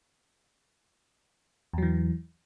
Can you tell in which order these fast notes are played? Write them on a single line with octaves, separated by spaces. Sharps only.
E2 F#3 E3